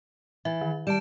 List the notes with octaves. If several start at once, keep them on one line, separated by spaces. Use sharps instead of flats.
E3 E5
D#3
G3 A5 D7 E7